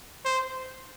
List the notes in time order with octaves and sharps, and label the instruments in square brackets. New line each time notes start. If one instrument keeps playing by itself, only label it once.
[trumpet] C5